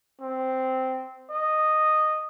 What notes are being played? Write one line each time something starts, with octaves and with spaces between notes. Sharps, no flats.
C4
D#5